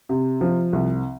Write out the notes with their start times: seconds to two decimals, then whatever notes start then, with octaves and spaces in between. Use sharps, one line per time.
0.09 C3
0.41 F3
0.73 C2